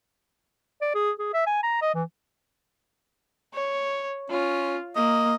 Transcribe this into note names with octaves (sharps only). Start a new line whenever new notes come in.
D5
G#4
G#4
E5
G#5
A#5
D#5
E3
C#5
C#4 F4
A#3 D#5